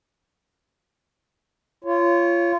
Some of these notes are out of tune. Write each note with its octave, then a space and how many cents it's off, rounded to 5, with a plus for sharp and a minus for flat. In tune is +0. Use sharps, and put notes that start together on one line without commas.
F4 -25 C#5 +0